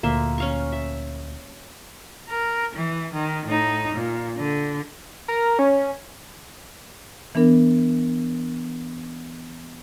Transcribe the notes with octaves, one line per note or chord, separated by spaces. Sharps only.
D2 A#2 A#3 E5 C6
C#4 F5 C#6
E5
A#4
E3
D#3
A2 D#4
A#2
D3
A#4
C#4
E3 B3 D4 A#4